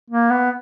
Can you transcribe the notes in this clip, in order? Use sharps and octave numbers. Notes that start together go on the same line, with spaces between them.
A#3
B3